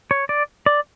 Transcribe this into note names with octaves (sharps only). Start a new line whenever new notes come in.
C#5
D5
D5